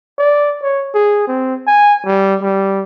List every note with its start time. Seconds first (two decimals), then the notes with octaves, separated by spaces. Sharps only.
0.18 D5
0.62 C#5
0.94 G#4
1.27 C4
1.67 G#5
2.05 G3
2.41 G3